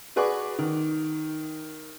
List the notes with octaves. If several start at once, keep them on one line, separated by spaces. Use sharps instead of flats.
F#4 G#4 B4 D5 C#6 D6
D#3